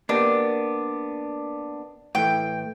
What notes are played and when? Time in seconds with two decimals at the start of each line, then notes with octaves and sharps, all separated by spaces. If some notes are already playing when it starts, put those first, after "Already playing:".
0.09 A#3 B3 D4 G4
2.15 A2 E3 A3 G5